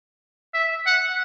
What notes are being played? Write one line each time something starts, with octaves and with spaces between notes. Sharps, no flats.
E5
F#5